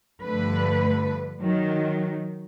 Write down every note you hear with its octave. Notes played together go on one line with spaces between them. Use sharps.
G2 D3 F3 A3 B4
D#3 F#3